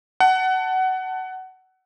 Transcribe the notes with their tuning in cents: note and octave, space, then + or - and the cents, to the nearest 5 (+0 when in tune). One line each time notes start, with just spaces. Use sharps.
F#5 +20 A5 +5